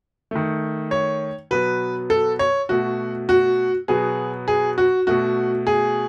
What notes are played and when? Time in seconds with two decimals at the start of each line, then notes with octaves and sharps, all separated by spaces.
0.31 D#3 A3
0.91 C#5
1.51 B2 F#3 B3 B4
2.10 A4
2.39 C#5
2.69 B2 A3 F#4
3.29 F#4
3.88 B2 F#3 B3 G#4
4.48 G#4
4.78 F#4
5.07 B2 A3 F#4
5.67 G#4